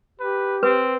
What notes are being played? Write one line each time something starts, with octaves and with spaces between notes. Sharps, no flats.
G4 B4
C4 B4